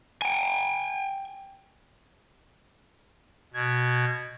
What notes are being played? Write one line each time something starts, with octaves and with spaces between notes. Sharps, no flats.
G5 G#5
B2 G#6